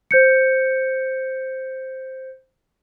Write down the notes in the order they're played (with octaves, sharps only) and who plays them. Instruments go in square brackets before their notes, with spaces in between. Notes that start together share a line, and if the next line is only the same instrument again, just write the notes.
[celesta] C5 G6 C#7